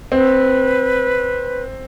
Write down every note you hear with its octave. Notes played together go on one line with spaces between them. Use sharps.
C4 B4